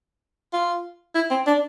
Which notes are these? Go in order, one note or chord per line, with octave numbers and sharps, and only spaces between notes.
F4
E4
C4
D4